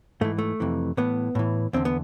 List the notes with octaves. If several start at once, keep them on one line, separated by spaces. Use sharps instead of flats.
G#2 E3 A3
A3
F2 C3 E3
A2 E3 B3
A2 E3
E2 D3 C4
B3